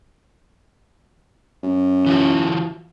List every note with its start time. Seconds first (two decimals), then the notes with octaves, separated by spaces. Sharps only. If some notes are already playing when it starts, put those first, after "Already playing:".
1.63 F#2
2.06 E3 F4 F#4